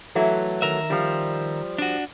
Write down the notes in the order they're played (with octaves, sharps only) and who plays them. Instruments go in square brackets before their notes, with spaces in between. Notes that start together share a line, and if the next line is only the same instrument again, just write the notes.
[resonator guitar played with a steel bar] E3 F#3 A3
[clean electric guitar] D#3 A#4 E5
[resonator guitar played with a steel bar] F3 G3
[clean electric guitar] D4 F#4